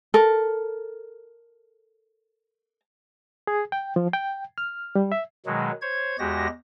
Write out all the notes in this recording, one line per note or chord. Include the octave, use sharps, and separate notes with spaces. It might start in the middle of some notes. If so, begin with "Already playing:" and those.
A4 A#4
G#4
G5
F3
G5
F6
G3
E5
B2 D#3 F#3 G#3
C5 C#5 G#6
E2 G#3 F#4 G4 A#6